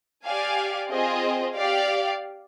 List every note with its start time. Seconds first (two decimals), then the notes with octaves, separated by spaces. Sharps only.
0.26 G4 D5 F5 G#5
0.91 C4 F4 G#4 C5 D#5
1.56 G4 D5 F5